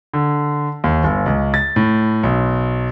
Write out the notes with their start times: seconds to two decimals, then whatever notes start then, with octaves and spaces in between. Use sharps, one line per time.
0.14 D3
0.84 D#2
1.04 G1
1.26 C#2
1.54 A6
1.76 A2
2.23 B1